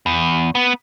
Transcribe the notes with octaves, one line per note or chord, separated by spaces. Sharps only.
E2
B3